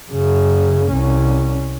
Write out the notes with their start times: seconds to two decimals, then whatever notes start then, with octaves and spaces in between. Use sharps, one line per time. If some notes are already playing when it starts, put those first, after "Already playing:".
0.11 F#2 C#3
0.92 C2 C#4